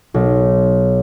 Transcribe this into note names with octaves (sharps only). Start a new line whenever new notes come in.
B1